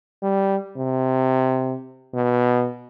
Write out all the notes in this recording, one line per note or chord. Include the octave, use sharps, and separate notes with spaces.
G3
C3
B2